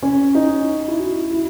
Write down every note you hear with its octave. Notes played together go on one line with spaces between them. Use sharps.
C#4
D#4
E4
F#4
E4